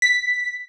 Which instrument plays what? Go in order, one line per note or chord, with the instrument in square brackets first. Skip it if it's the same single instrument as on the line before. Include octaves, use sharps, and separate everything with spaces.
[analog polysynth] B6